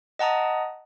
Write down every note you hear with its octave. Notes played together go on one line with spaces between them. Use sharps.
D#5 F#5 A5 A#5 D#6